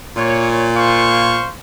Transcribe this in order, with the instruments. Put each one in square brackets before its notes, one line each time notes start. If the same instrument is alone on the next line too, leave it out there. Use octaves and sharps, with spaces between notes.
[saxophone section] A#2 [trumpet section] C#5
[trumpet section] C5 F5 C#6